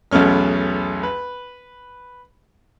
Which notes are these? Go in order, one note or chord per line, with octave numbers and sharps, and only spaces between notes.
B1 E2 A3 C#4 F6
B4